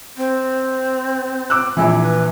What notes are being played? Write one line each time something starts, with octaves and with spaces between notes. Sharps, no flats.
C4
D6 E6 F#6
A#1 E3 E4
B4